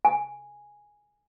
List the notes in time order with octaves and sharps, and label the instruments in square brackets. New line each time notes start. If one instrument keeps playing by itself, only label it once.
[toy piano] G#5